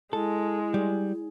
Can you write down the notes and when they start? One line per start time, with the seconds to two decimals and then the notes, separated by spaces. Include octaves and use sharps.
0.13 G#3 E4 A4
0.74 G3